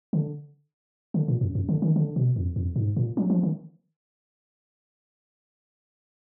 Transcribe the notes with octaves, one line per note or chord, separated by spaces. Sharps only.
D3
D3
A#2
F#2
F#2
D3
D#3
D3
B2
F2
F2
G#2
A#2
F#3
F3
D#3